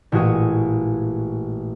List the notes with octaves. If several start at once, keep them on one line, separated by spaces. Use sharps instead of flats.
A1 A#2 G#3 F#4 G#4 G#5